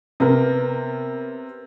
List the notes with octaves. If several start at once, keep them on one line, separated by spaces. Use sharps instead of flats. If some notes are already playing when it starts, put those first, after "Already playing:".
C3 B3 A#4